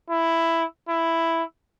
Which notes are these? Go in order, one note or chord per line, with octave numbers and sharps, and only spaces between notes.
E4
E4